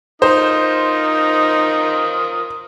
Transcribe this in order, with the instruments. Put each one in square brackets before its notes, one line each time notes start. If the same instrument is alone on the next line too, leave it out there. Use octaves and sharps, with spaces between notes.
[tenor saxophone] D#4 [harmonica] F4 A#4 D#6 [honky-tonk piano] C5